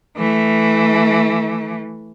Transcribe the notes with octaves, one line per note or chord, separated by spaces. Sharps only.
E3 A3